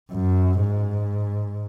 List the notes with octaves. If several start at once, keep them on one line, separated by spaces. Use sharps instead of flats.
F#2
G#2